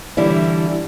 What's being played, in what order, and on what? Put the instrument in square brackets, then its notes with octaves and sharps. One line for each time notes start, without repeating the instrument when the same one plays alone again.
[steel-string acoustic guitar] D3 E3 G3 E4